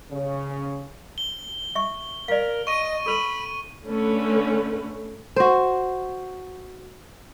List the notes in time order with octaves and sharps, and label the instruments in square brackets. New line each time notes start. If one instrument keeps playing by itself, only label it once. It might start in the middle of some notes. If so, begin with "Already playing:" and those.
[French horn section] C#3
[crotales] G7
[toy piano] E5 C#6
[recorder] A#4 [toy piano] D5 F5
[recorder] D#5 [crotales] C#6 D#7
[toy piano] A4 B4 [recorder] B5
[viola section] D3 A3 C#4 B4
[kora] F#4 C5